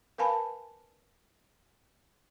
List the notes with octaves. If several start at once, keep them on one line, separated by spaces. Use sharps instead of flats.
A#4 B4 F5 G#5 A5 B5